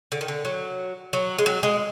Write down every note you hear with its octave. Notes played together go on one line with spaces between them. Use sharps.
D3
D#3
D3
F#3
F#3
G#3
F#3
G#3